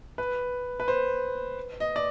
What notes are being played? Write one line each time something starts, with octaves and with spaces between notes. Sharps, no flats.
B4
B4
C5
D#5
D5